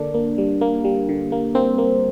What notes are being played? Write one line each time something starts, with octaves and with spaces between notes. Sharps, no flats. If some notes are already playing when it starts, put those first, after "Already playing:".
Already playing: D3 A#3 D4
A#3
G3
A#3
G3
D3
A#3
A#3 C4
A#3